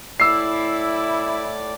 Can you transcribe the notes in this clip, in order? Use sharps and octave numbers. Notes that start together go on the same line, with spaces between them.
A2 E4 D5 D6 E6 C7